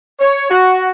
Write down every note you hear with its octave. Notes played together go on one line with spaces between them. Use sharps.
C#5
F#4